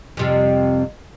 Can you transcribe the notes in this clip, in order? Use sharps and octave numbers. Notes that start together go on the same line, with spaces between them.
F2 C3 G3